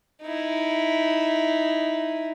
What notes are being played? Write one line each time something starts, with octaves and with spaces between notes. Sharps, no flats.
D#4 E4